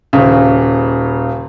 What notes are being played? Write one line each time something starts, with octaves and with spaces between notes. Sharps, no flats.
D#1 C#3